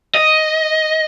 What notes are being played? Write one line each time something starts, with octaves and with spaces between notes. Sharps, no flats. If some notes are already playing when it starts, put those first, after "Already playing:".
D#5